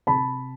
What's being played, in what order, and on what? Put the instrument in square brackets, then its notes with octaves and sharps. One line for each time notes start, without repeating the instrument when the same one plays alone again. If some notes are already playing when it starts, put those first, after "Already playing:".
[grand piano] C3 A5 B5